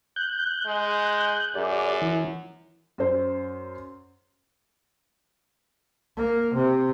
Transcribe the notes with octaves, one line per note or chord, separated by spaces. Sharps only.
F#6 G6
G#3
F#2 G#4 D5
E3
F#2 C5
A#3
C3